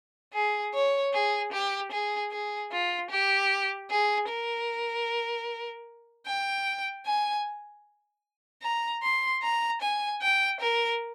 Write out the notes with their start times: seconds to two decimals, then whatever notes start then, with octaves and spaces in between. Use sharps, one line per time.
0.33 G#4
0.74 C#5
1.13 G#4
1.52 G4
1.91 G#4
2.31 G#4
2.71 F4
3.10 G4
3.90 G#4
4.29 A#4
6.26 G5
7.06 G#5
8.63 A#5
9.02 C6
9.42 A#5
9.82 G#5
10.22 G5
10.60 A#4